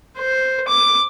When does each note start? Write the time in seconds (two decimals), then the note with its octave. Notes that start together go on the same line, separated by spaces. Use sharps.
0.18 C5
0.68 D6